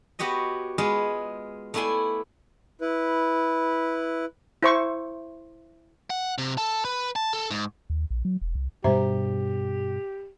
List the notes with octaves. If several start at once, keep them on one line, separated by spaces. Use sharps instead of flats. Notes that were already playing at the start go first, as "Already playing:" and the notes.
B3 F#4 G4 C#5 D#5
G#3 B3 F4 G#4
A3 B3 E4 D5 G#5 C6
E4 B4
E4 C5 C#6
F#5
C3
A4
B4
A5
A4
G#2
D#2
A#1
F#3
E1
C2
G2 B2 G3 G4 C5 E5 A#5